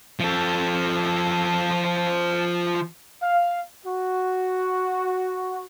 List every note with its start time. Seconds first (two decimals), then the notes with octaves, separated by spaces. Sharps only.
0.20 F3 A4
3.21 F5
3.85 F#4